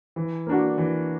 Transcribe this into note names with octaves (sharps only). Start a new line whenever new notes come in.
E3
A#3 D4 F#4
E3